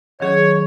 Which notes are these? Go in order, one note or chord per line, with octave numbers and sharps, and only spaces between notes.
D#3 F#3 C#4 G#4 C#5